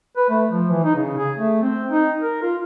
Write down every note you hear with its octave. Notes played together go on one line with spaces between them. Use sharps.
B4
A3
F3
E3
D#4
C#3
G#4
A3
C4
D#4
A#4
F4